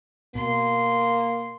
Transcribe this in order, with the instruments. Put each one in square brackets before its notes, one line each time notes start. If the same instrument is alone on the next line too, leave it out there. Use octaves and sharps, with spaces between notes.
[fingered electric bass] B2 [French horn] A#3 [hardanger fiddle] C6